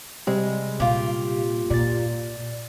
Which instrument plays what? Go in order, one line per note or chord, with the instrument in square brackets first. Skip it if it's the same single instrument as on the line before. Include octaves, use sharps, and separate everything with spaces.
[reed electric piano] C3 G3 C4 [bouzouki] G#3
[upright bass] A#2 [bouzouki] F4 G4
[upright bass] A#2 [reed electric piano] D5 A6